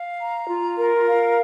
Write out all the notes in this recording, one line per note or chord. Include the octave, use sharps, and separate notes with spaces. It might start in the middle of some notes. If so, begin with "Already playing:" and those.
Already playing: F5
A#5
F4
A#4
F5